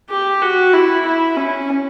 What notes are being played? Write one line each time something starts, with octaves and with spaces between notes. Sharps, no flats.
G4
F#4
E4
E4
C#4